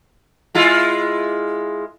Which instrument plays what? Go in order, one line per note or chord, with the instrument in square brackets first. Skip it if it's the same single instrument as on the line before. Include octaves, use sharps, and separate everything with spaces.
[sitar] G#3 E4 F4